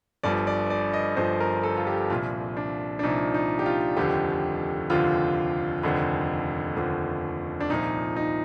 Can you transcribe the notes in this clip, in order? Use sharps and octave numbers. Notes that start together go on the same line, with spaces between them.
G1 G2 F3 D5
D5
D5
D#5
G1 G2 F3 C5
A#4
A4
F4
G4
C2 A#2 F3 F4
D4
D4
C2 A#2 F3 D#4
D#4
G4
F4
F1 D#2 D3 F3 G4
F1 D#2 D3 F3 F4
F1 D#2 D3 F3
F1 D#2 D3 F3
D4
C2 A#2 F3 D#4
D#4